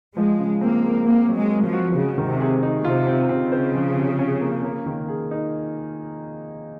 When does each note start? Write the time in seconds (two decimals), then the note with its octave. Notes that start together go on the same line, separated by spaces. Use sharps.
0.17 F3 G#3
0.39 C#3
0.61 A#3 C4
0.84 G#3
1.06 A#3 C4
1.29 F#3
1.35 G#3
1.51 A#4
1.66 F3
1.73 F#4
1.96 C#3 G#3
2.18 D#3
2.25 C3
2.40 G#4
2.63 D#4
2.84 C3 F4
3.07 C4
3.29 C#3 C4
3.52 C5
3.75 F3
3.96 C3
4.19 C#4
4.41 A#3
4.64 A#3
4.86 D#3
5.08 G#4
5.31 D#4